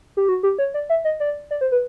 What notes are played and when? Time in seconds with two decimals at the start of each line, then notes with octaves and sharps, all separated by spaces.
0.17 G4
0.29 F#4
0.43 G4
0.59 C#5
0.74 D5
0.89 E5
1.05 D#5
1.20 D5
1.51 D5
1.61 C5
1.72 B4